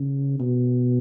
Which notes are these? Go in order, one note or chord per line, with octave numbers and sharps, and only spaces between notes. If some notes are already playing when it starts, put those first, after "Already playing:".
Already playing: C#3
B2